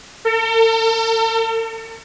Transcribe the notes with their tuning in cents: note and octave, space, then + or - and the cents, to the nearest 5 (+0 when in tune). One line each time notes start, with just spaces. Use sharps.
A4 +45